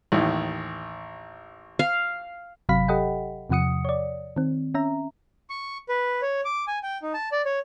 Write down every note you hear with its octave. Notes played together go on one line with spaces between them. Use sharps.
A1 D#2
F5
G1 C3 F#3 F5 B5 B6
G4 A4 D#5 F#5 G5
E2 C3 F3 F#5 D#6 C#7
C#5 D5
D#3 C4
C#4 E5 A#5
C#6
B4
C#5
D6
G#5
G5
D#4
A5
D5
C#5